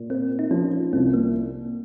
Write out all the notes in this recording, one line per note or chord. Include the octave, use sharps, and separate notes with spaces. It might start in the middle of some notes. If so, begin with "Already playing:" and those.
Already playing: A#2
A#3 C4
D#4
F3 C#4
C2 C4
A#3